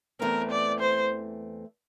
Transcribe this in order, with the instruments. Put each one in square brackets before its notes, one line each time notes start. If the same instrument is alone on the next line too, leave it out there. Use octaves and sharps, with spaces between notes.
[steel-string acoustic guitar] E2 E3 A3 C4 [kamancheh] A#4
[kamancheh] D5
C5